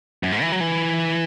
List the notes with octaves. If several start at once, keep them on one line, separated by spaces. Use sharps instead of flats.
F#2
G#2
E3
F#3
E3